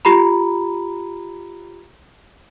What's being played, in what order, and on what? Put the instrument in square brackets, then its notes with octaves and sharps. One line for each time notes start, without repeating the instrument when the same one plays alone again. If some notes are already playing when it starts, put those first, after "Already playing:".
[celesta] F4 G4 A#5 B5